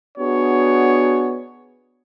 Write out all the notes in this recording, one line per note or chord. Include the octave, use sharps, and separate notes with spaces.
B3 D4 F#4 G#4 C#5